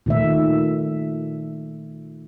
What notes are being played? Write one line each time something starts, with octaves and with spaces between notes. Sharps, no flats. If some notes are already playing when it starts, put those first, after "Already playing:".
A#2 D#3 A3 E5